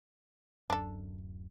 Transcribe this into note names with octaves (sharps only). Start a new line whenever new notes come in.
D1 F#2 D4 A4